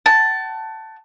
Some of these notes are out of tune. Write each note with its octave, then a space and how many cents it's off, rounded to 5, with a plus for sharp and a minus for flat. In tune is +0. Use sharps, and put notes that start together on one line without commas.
F#5 +40 A5 +5